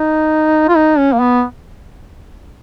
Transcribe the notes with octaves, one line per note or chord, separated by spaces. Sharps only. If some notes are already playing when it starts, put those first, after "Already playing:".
Already playing: D#4
F4
D#4
C#4
A#3
B3